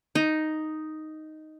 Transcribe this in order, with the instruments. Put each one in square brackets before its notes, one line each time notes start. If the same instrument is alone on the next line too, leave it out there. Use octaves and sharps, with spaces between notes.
[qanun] D#4